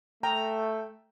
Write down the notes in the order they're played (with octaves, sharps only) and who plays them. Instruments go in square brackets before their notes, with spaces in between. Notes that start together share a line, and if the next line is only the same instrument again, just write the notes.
[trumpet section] A3 [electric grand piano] G5 [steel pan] A#5